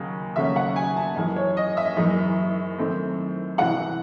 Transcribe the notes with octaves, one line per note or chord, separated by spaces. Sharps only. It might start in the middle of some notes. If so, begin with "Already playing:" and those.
Already playing: D#2 C#3 F#3
D#2 C#3 F#3 A3 C#4 E5
F#5
G#5
A5
F#2 E3 G#3 G#5
C#5
D#5
E5
F#1 F#2 E3 G#3 D#4
F#2 D#3 A3 C4
C2 C3 E3 G#3 F#5